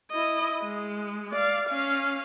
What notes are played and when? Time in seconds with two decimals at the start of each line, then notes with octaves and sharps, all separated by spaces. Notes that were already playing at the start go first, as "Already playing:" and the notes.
0.11 E4 D#5
0.63 G#3
1.31 D5 F5
1.68 C#4 F5